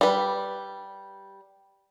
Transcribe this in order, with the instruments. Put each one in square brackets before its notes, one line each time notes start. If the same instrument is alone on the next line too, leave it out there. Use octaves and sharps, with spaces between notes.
[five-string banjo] G3 B4